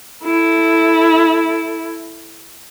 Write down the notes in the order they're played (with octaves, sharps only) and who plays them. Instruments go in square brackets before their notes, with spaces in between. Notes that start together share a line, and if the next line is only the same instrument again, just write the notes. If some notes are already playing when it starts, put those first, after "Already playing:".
[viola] E4 A4